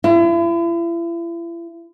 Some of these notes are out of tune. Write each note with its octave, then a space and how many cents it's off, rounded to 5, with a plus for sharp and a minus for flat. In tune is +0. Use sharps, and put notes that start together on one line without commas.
E4 +40